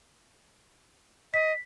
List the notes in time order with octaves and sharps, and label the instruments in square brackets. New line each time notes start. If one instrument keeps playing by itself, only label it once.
[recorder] D#5 [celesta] B6